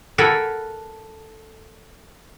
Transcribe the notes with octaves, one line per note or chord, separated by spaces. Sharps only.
A4 A#4 F#5 G#5 B5